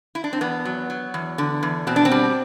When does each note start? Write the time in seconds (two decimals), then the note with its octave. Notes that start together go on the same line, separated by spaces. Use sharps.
0.15 E4
0.24 D4
0.33 C4
0.41 E2 B3
0.65 F#3
0.90 F#3
1.14 E2
1.38 D3
1.63 E2
1.87 B2 C4
1.96 D4
2.05 C4
2.11 G3